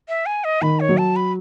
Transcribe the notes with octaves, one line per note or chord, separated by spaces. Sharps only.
E5
G#5
D#5
D#3 B5
C#5
F#3
A5
B5